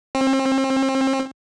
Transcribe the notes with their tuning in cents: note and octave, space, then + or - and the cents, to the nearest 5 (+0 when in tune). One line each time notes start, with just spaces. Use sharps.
C4 +35